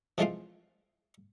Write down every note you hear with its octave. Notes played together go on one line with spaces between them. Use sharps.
E3 F3 G#3 A3 C4 F4